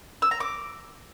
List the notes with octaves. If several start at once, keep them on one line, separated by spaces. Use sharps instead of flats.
E6
A#5
D6